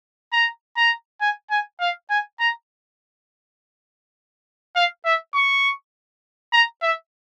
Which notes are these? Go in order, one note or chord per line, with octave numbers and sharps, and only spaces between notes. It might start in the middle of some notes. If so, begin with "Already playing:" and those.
A#5
A#5
G#5
G#5
F5
G#5
A#5
F5
E5
C#6
A#5
E5